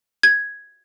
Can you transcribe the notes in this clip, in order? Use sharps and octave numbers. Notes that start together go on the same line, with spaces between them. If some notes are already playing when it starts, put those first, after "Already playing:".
G#6